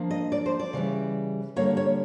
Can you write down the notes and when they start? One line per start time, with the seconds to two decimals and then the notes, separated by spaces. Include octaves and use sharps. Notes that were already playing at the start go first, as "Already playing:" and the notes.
Already playing: F3 A#3 D4
0.10 D#5
0.32 D5
0.46 C5
0.59 D5
0.73 C#3 E3 G3
1.56 D3 G3 A#3 C#5
1.77 C#5